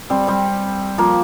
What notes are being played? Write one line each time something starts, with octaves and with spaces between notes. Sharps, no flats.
G3 C4
G3 C4
F3 A#3